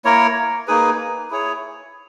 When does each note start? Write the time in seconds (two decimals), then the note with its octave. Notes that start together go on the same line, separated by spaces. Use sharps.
0.05 A#3 E4 A#4 C#5
0.68 A#3 D#4 G#4 B4
1.30 E4 G#4 C#5